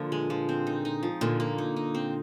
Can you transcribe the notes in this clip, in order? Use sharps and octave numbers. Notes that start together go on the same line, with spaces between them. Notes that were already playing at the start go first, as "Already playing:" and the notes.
Already playing: A#2 D3 F3
G#3
F3
C4
D#4
D#4
F3
A#2 D3 A#3
A#3
D#4
D#4
C4